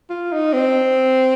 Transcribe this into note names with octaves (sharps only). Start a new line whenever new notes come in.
F4
D#4
C4